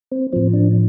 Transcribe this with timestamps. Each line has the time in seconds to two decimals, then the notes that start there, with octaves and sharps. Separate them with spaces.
0.12 C4
0.33 A2 F3 C4
0.53 D4